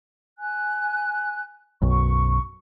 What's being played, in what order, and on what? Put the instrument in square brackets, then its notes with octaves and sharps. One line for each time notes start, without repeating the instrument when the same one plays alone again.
[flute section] G#5 F#6
[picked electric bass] B1 F#2 [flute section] C#6